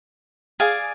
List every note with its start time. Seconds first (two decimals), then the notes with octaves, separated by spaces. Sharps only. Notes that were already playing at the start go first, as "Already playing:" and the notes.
0.60 G#4 D5 F5 G#5